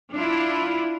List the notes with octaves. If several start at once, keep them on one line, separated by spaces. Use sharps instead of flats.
D4 E4 F4